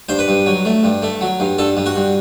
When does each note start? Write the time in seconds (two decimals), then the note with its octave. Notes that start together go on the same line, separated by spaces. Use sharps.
0.09 G2 C5
0.19 B4
0.28 G2
0.46 F#3
0.65 A3
0.84 G2
1.02 A3
1.21 F#3
1.40 G2
1.58 G2 A4
1.77 G2
1.86 F#4
1.96 G2